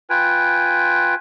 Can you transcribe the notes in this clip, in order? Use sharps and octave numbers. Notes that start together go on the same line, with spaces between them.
F4 B4 G5 G#5